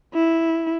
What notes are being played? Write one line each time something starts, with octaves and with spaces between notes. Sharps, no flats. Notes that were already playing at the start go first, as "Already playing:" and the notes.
E4